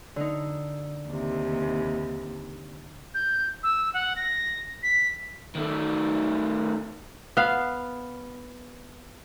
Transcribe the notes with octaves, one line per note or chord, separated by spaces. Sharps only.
D3 D#4
D#2 C3
G6
E6
F#5
A#6
B6
D#3 A3
B3 F5